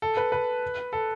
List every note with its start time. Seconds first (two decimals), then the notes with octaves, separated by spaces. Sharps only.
0.02 A4
0.17 B4
0.32 B4
0.93 A4